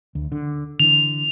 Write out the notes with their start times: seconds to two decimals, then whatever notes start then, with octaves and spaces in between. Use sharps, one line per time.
0.15 D2
0.32 D3
0.80 D3 E3 F7